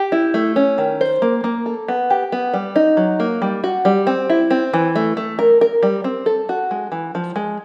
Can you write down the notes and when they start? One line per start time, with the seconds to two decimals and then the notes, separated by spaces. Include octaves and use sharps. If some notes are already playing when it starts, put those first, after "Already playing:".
Already playing: G4
0.12 E4
0.34 A3
0.56 C#4
0.78 D#3
1.01 C5
1.22 A#3
1.44 A#3
1.66 A4
1.88 B3
2.10 G4
2.32 B3
2.54 G3
2.76 D#4
2.97 F#3
3.20 A#3
3.42 G3
3.64 F#4
3.85 G3
4.07 C4
4.30 E4
4.51 C4
4.74 E3
4.96 A3
5.17 A3
5.39 A#4
5.61 A#4
5.83 G3
6.04 C4
6.26 A4
6.49 F#4
6.71 G#3
6.92 E3
7.15 F3
7.36 G#3